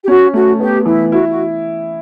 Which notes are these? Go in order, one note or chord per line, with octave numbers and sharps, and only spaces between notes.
G4
C#4 F#4
A3 F#4
B3 G4
E3 E4
E4 F#4
F#4